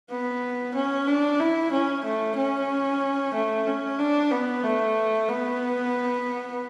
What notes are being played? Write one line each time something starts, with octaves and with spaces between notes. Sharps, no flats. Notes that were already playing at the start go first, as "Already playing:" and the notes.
B3
C#4
D4
E4
C#4
A3
C#4
A3
C#4
D4
B3
A3
B3